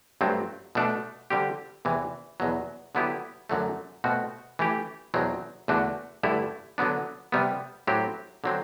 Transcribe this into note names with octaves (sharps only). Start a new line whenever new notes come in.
G2 F#3 A3 C4
B2 A3 D4
D3 G3 C4 G4
E2 C3 E3
E2 B2 F#3
D3 F#3 B3 E4 G4
F#2 D3 F#3 A3
B2 A3 C4 F#4
E3 A3 E4 G4
E2 B2 F#3 C4
E2 D3 A3 D4 F#4
G2 D3 A3 E4
D3 F#3 B3 D4
C3 G3 B3
A2 F#3 C4 G4
D3 F#3 C4